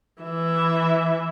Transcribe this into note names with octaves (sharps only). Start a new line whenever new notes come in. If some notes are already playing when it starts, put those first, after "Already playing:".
E3 E5